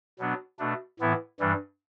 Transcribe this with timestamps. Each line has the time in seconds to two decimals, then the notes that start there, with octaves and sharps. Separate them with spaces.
0.19 B2 F#3 B3 D4
0.59 B2 A3 D4
0.99 A2 E3 B3 E4
1.40 G2 E3 G3 D4